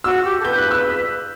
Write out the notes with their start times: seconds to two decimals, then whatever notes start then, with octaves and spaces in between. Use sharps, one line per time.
0.04 F#4 E6
0.24 G4
0.39 A4
0.45 B4 G6
0.58 F#6
0.71 E6